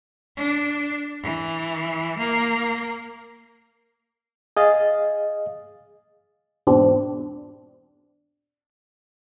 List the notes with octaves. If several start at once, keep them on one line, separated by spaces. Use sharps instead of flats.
D4
E3
A#3
G#4 D#5 F5 A6
E2 G#2 B2 C4 D4